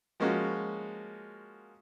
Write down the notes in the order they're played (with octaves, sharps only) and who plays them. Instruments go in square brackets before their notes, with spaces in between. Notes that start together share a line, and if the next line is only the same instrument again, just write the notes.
[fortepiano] F3 G#3 A#3 C#4 F#4